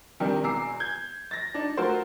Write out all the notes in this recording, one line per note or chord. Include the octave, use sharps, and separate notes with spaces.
C3 D#3 G3 D4
E1 E2 A#5 D6 E6 C7
G6 G#6
A6 A#6
D4 D#4
F#3 A3 F4 F#4 A#4 C5